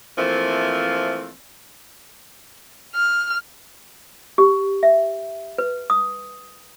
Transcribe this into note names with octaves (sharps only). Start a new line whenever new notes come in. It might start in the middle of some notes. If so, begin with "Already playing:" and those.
E3 F3 A3 A#3 C4
F6
G4
E5
B4
D#6